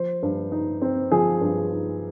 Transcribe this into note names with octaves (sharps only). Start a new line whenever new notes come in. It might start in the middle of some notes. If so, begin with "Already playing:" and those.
Already playing: F3 C5
G2
D#4
C4
F3 G#4
G2
D#4